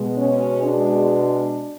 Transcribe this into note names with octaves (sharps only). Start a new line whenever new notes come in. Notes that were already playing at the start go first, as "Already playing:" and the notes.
Already playing: B2 G#3
C#4
D4